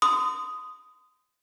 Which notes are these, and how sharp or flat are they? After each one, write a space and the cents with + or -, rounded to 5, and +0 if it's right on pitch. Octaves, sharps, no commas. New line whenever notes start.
C6 -35 D#6 +0